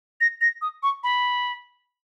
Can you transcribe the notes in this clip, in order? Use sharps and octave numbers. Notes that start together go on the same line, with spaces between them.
A#6
A#6
D#6
C#6
B5